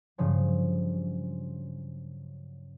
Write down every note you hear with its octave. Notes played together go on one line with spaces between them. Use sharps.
G2 C#3 F3 F#3